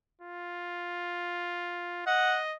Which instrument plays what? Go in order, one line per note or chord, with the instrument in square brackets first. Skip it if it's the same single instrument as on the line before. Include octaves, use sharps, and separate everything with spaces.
[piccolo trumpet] F4
[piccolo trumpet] D#5 [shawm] F#5